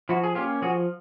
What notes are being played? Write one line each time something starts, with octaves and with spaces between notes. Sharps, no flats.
F3 E4 F#4
G#4
A#3 C#4 F4 G4
F3 F#4 G#4